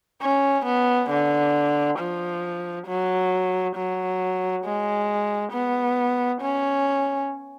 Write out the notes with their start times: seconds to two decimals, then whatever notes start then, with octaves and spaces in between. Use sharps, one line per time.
0.22 C#4
0.66 B3
1.10 D3
1.99 F3
2.87 F#3
3.76 F#3
4.65 G#3
5.52 B3
6.41 C#4